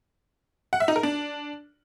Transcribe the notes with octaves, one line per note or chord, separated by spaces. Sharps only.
F#5
E5
D#4
A#4
D4